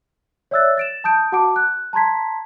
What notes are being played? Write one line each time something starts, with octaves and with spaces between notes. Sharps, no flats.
C#5 D5 E5 E6 F#6 A6
A6 D7 E7
A5 D#6 G6 D7
F#4 F#5 A5 D6 D7
F#6
A5 A#5 C6 G#6 B6